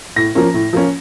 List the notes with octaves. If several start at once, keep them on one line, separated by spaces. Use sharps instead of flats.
A2 A#6
F3 A#3 C#4
A2
F3 A#3 C#4